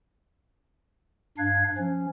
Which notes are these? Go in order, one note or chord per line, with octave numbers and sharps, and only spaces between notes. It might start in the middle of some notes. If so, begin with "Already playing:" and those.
G2 D4 F5 F#6 G#6
F3 C#4